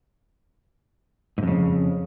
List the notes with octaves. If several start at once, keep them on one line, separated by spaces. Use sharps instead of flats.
F2 G#2 C#3